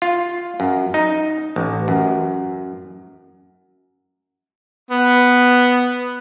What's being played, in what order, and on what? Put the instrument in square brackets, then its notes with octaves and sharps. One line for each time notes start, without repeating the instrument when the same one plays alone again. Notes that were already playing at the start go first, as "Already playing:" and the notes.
[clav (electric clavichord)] F4
F#2
D#4
A1
F#2
[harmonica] B3